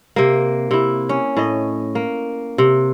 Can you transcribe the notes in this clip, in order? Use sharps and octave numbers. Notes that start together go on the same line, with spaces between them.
C3 A#3
C3 E4
C#4
A2 D#5
A#3
C3